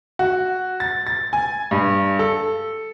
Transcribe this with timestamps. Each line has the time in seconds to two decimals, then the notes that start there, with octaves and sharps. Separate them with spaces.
0.19 F#4
0.80 A6
1.07 A6
1.33 G#5
1.71 G2
2.19 A4